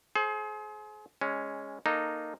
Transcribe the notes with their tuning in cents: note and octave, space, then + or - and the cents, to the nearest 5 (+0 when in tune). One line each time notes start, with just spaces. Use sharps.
G#4 +35 C5 +15
G#3 -10 C#4 +0
A#3 +0 D#4 -10 A4 +0